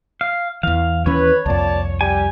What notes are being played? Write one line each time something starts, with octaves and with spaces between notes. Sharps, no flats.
F5
E2 E3 F5
D#2 E3 C#4 B4 C#5
C2 F2 A#2 D5 A5
G3 G4 G#5